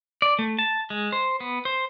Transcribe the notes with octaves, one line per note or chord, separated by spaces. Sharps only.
D5
A3
A5
G#3
C5
B3
C5